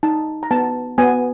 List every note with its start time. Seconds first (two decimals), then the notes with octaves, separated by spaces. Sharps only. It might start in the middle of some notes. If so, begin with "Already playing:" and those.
0.03 D#4 A5
0.43 A#5
0.51 B3 A5
0.98 B3 G#5